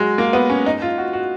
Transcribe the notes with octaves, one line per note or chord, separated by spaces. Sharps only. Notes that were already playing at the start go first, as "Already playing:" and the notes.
Already playing: F#3 G#3
A#3
B3
C#4
D#4
F4
F#4
F#4